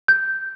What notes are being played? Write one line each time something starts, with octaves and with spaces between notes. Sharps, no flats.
G6